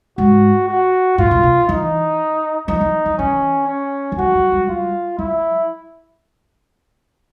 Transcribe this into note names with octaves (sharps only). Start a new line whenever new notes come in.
G#2 F#4
F#4
A2 F4
A#2
B2
E3 D#4
F3 D#4
E3
E3
E3 C#4
C#4
E3
F3 F#4
F#3
G3
G3 F4
F#3 E4